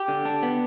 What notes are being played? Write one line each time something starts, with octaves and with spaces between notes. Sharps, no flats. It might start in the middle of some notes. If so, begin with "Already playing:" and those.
Already playing: G4
D3
D4
B3